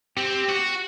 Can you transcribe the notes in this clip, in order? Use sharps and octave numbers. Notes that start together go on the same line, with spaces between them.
C4 G4
F#4